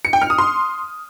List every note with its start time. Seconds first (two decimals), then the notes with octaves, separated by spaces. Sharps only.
0.05 C#7
0.13 G5
0.22 F6
0.30 D#6
0.38 C6